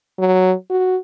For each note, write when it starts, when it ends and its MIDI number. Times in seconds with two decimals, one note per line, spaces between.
0.19 0.53 54
0.70 0.97 66